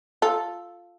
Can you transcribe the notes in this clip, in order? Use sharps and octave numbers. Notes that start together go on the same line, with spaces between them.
F4 A4